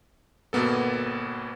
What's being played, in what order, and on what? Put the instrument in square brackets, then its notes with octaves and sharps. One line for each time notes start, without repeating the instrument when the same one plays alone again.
[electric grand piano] G#1 B2 A#3 B3 A4